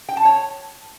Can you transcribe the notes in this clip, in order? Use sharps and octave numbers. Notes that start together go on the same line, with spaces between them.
G5
A5
C#5